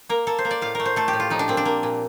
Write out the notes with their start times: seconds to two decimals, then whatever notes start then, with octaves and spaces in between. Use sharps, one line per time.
0.09 A#3 A#4
0.27 A#3 A4
0.39 C5
0.45 A#3
0.51 D5
0.61 A2 F5
0.75 A3 A#4
0.85 C5
0.96 A3 A4
1.08 G4
1.13 A2
1.20 F4
1.30 F3 D#4
1.39 D4
1.48 A#2 C4
1.57 D4
1.65 A#3
1.83 A#2